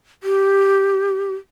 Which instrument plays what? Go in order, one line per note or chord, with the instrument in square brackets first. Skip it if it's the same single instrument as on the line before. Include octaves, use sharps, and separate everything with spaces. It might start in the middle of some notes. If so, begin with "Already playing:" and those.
[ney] G4